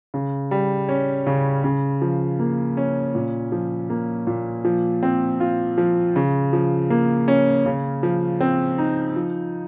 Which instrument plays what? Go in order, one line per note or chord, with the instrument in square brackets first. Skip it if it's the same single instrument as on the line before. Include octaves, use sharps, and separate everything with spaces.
[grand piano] C#3
G3
C#4
C#3
C#3
F3
A#3
C#4
A#2
F3
A#3
A#2
F3
C4
F4
F3
C#3
F3
A#3
C#4
C#3
F3
C4
D#4
F3